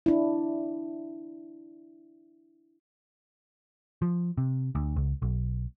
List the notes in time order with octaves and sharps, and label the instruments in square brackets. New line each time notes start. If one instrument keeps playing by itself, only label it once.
[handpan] D4 E4
[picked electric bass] F3
C3
D2
C#2
B1